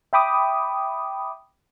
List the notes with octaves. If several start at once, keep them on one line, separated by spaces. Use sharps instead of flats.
E5 G5 B5 D6 D#6